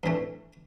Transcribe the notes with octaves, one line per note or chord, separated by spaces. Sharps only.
G2 E3 A3